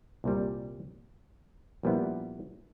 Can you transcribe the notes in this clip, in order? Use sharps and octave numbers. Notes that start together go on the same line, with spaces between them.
C2 A#2 G3
A#1 A#2 G3 B3 E4